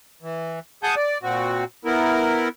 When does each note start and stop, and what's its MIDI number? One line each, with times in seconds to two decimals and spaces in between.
0.22 0.59 52
0.83 0.95 68
0.83 0.95 78
0.83 0.95 80
0.83 0.95 81
0.83 0.95 87
0.83 0.95 91
0.96 1.18 74
1.23 1.64 46
1.23 1.64 60
1.23 1.64 66
1.85 2.48 59
1.85 2.48 64
1.85 2.48 70